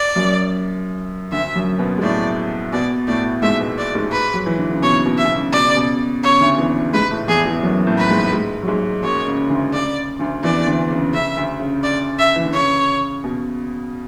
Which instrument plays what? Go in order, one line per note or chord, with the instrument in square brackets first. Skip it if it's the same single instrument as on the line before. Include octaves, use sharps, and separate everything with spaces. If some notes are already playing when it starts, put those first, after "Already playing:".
Already playing: [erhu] D5
[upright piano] F#2 F#3
[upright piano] D2 D3 [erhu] E5
[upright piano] F#2 F#3
B2 B3
G#3
[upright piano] A2 A3 [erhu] D5
[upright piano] B2 B3 [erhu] D5
[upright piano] A2 A3 [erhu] D5
[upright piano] G#2 G#3 [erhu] E5
[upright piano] B2 B3
[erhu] D5
[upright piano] G#2 G#3
[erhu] B4
[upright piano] F#3
E3
D3
C#3
[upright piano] B2 [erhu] C#5
[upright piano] B2
[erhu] E5
[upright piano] B2
C#3
[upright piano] B2 [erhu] D5
[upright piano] C#3
B2
[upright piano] C#3 [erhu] C#5
[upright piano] D2 D3
E2 E3
[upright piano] G#2 G#3 [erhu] B4
[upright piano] A2 A3
[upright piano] E2 E3 [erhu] G#4
[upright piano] E2 E3
F#2 F#3
A2 A3
[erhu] B4
[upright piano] G#2 G#3
G#2 G#3
F#3
G#2 G#3
[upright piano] F#2 F#3 [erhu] C#5
[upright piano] C#3
D2 D3
[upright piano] C#3 [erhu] D5
[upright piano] D2 D3
[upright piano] E2 E3 [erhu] D5
[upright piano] D2 D3
C#3
[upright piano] C#3 [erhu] E5
[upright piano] D2 D3
C#3
[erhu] D5
E5
[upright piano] E3
D3
[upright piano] C#3 [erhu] C#5
[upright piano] B2